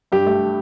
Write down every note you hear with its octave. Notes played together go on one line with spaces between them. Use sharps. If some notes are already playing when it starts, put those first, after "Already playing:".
G2 G4
A3